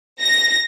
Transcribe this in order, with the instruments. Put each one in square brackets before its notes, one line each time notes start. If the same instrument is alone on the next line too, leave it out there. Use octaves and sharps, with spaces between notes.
[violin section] A#6